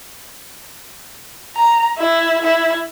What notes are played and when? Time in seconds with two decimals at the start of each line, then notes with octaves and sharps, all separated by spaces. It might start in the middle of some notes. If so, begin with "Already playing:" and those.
1.55 A#5
1.98 E4
2.43 E4